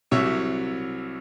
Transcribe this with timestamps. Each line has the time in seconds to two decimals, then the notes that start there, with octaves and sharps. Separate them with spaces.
0.11 C2 C3 F#3 C#5 E5